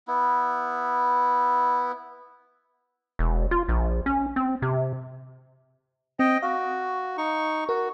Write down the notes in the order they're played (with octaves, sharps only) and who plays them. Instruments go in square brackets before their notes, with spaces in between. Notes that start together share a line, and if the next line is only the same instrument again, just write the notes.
[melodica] B3 E4
[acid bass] E1
F4
A#1
C#4
C4
C3
[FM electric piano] C4 [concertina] D#5 G5
[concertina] F#4 [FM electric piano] F5
[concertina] D#4 C#6
[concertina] F#4 [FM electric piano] A#4